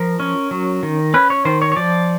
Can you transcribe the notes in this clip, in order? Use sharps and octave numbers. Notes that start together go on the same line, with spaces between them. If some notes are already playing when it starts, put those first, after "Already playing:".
Already playing: F3 A#4
C#4
F#3
D#3
C#4 B4
C#5
D#3 C5
C#5
C#5
F3 D5